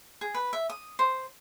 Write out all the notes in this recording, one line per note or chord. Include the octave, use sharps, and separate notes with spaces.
G#4
B4
E5
D#6
C5